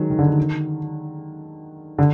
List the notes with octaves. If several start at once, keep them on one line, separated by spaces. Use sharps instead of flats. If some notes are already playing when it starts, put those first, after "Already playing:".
Already playing: D#3 F#3 G#3
D#3
D3
D#3
D3